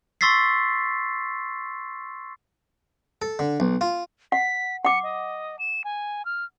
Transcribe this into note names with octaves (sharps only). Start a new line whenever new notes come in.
C6 C#6 E6 A6 B6 C7
A4
D3
B1
F4
F#5 B6
F#5 D6 C#7
D#5
E7
G#5
F6